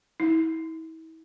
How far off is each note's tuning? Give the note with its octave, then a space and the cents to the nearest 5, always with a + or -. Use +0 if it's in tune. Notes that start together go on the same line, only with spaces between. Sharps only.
E4 -40